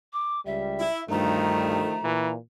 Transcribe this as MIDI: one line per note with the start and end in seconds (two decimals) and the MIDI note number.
0.13 0.40 86
0.46 0.85 37
0.46 0.85 55
0.46 1.04 76
0.80 1.00 64
1.09 2.10 38
1.09 1.82 43
1.09 1.95 51
1.09 2.10 53
1.09 2.10 57
1.09 2.31 82
2.04 2.35 46
2.04 2.33 52